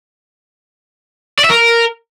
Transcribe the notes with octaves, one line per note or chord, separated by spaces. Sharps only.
D5
E5
A#4